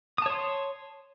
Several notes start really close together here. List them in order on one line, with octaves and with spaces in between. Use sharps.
D#6 A5 C#5 C6